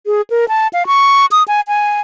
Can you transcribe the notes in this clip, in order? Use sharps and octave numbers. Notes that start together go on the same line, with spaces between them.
G#4
A#4
A5
F5
C#6
D#6
G#5
G#5